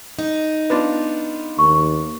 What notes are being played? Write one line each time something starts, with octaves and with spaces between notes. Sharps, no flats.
D#4
B3 D4 F4
D#2 C#6